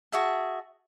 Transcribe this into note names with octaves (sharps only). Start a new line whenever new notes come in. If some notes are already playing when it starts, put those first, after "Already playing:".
F#4 G#4 E5 A5